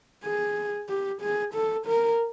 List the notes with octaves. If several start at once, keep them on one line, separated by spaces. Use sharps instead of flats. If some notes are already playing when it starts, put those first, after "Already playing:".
G#4
G4
G#4
A4
A#4